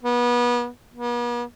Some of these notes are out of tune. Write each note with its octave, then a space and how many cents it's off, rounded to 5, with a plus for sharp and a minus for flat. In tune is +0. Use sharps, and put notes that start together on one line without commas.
B3 -30
B3 -45